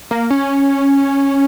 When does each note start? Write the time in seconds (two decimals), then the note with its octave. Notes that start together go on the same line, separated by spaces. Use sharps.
0.11 A#3
0.30 C#4